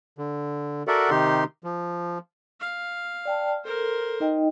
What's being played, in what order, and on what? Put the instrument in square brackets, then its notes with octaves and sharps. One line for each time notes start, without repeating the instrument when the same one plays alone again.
[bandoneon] D3
F#4 A4 A#4 D5 E5 F#5
C3 D#3 D#4 G4 C6
F3
[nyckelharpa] F5
[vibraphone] D5 G5 A5
[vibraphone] A4 [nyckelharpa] A#4 C5
[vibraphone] D#4 D#5 G5